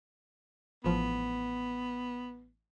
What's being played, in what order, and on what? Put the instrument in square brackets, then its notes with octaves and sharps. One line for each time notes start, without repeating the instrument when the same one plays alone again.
[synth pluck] A1 F3 [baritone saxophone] B3